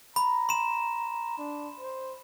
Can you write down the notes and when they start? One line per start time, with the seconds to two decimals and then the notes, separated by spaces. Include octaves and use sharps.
0.16 A#5 B5
0.49 C6 E7
1.38 D4
1.80 C5